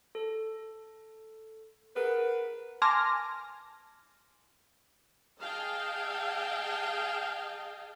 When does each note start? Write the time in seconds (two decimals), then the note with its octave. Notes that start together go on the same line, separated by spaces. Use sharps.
0.15 A4
1.96 G#4 A#4 B4 F#5
2.82 G#5 A5 C6 D6 F6 A#6
5.41 G#4 D#5 F5 G5 A5